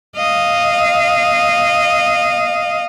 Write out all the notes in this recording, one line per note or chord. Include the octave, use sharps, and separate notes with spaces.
D#5 F5